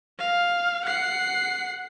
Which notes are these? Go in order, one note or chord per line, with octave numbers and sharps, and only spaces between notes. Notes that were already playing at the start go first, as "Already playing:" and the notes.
F5
F#5 C7